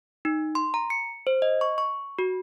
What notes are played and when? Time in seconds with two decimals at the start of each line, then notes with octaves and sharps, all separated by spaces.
0.25 D#4
0.55 C6
0.74 A#5
0.90 C#7
1.27 C5
1.42 D#5
1.61 C#6
1.78 C#6
2.19 F#4